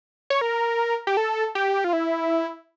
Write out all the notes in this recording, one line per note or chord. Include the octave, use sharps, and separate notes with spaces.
C#5
A#4
G4
A4
G4
F4
E4